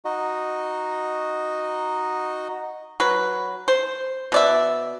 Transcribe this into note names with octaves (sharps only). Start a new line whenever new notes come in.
D#4 F#4 D#5
F#3 B4
C5
B2 D5 E5